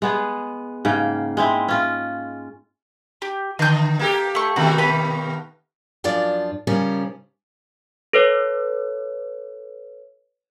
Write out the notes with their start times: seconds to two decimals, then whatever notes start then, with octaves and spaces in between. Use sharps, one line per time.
0.02 G#3 B3 G#4
0.85 G#2 C#3 A#3 G5
1.37 G#3 C4 E4
1.68 C#4 F4
3.22 G4
3.59 D3 D#5 G6
3.99 A#3 G4 A4
4.35 A3 C#6
4.56 B2 D#3 A3 F#4
4.78 B3 F5 B5
6.04 F#2 F3 D4 F4 D5
6.67 C#3 F3 G3 C#4 A#4
8.13 A4 B4 C#5